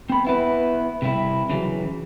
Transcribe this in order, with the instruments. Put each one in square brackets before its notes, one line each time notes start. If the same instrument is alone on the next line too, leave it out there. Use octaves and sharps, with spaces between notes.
[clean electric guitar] C4 B5
B3 E4 B4
C3 G3 E4
C#3 E3 F#3